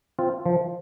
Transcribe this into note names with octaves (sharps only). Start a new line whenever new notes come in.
C4 F4
F3